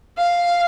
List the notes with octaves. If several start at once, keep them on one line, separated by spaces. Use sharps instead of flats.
F5